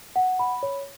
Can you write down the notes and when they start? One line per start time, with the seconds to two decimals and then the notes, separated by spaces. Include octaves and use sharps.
0.16 F#5
0.39 B5
0.63 C#5